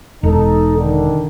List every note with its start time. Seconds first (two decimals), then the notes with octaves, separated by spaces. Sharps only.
0.23 E1 D#4 A4
0.77 D3 D#3